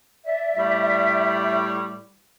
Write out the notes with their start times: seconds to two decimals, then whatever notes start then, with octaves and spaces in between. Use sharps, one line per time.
0.24 D5 E5
0.57 A2 G3